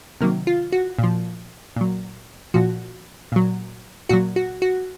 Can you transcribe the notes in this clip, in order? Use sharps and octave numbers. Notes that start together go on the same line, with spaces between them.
C3 D#3 F#3 A#3
F4
F#4
A#2 F3
A#2 F#3
A#2 F3 F#4
A#2 F#3
A#2 F#3 F#4
F#4
F#4